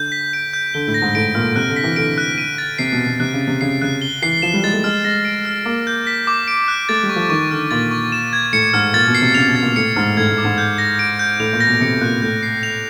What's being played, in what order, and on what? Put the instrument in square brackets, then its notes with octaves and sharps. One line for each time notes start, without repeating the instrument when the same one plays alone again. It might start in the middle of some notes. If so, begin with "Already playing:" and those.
Already playing: [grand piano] D3 [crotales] G6
[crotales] B6
D7
G6
[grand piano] D3 [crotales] G7
[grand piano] A2
[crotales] A#6
[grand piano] G#2
[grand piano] A2 [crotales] D7
[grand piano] A#2 [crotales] F6
[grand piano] C3 [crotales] F#6
[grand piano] D3
[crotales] B6
[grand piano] E3
[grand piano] D3 [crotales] D7
[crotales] F#6
D#7
A6
[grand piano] C3 [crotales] C7
[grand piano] B2
[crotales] F#6
[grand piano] B2
[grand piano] C3 [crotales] F#6
[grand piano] C#3
[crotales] A6
[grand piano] C3
[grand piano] C#3 [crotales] C7
[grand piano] C#3 [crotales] F#6
[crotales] G7
[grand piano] E3 [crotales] C7
[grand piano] F3 [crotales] E7
[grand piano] G3
[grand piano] G#3 [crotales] A6
[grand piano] A3
[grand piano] G#3 [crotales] F6
[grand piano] G#3 [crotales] A#6
[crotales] D7
F6
[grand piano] A#3 [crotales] D6
[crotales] G6
B6
D6
D7
F#6
[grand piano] A3 [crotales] A6
[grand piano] G3
[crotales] C#6
[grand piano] F3
[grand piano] D#3 [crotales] C#6
[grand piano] D3 [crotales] F6
[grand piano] A#2 [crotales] A6
[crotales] C#6
E7
G#6
[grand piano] A2 [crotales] C#7
[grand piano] G#2 [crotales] F6
[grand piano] A#2 [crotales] A6
[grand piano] B2
[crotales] C7
[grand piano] C3
[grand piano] C#3 [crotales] F7
[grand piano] B2
[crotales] A6
[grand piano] A#2
[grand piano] A2 [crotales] C#7
[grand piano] G#2 [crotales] F6
[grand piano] A2 [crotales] G#6
[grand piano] A2
[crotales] D6
[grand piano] G#2
[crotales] G6
A#6
D7
G6
[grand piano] A2 [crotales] F7
[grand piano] A#2
[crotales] A#6
[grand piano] B2
[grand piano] C3 [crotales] C#7
[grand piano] A#2 [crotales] F#6
[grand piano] A2 [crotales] G6
[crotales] C7
F7